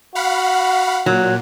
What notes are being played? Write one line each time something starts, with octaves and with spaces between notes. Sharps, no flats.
F#4 F5 F#5 B5
A#2 F#3